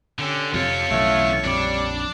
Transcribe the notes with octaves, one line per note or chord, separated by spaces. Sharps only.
D3 C#4 G4
F2 C3 F4 A4 C#5
B1 C#3 E3 A3
A#1 F2 G3 D4 D5